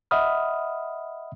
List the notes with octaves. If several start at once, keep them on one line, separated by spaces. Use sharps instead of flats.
D#5 E5 F#5 B5 D#6 F6